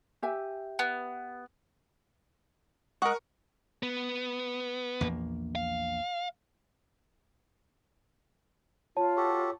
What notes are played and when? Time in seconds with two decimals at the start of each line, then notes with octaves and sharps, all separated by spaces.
0.22 G4 E5 G#5
0.79 B3
3.02 G#3 A#4 F#5 C#6
3.83 B3
5.01 A#1 E2 A#3
5.55 F5
8.97 F4 C#5 A5
9.17 F#4 G4 A4